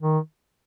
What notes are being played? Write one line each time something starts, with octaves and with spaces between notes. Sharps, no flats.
D#3